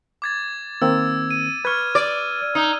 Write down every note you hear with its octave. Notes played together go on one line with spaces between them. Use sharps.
D6 G#6 A6
D#3 A#3 C4 E6
D#7
B4 C#6 F6 G#6
D5
D#4